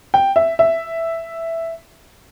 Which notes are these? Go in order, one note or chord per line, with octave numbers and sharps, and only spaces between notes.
G5
E5
E5